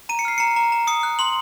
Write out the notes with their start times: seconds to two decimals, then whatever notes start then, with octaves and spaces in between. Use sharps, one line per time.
0.09 A#5 D#7
0.19 C#7
0.25 F6 C7
0.38 A#5 C#7
0.56 A#5
0.72 A#5
0.87 D#6 C#7
1.03 F#6
1.19 C6 F#7